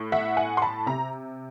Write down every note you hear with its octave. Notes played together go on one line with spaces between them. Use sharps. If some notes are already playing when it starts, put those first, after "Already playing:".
Already playing: A2
E5 F#5
F#5 G#5
C6
A5 B5
C3 A#5